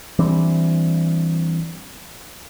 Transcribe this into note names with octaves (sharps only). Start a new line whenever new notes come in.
E3 G3 C4 D4